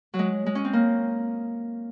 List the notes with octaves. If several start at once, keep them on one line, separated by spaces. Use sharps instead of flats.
F#3
G#3
G#3
C#4
C4
A#3